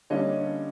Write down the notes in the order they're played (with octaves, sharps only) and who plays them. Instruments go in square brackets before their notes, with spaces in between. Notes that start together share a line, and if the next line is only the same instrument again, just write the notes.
[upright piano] D3 G3 A#3 C#4 [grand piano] C#5 D#5